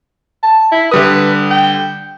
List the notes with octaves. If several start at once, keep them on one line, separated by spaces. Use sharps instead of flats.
A5
E4
D3 G3 B4 D#6
G5